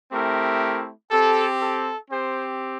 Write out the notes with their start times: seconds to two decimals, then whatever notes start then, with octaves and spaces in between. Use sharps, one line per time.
0.11 A3 C4 E4 G4 A#4
1.11 C4 G4 A4
1.60 A4
2.10 C4 G4 C5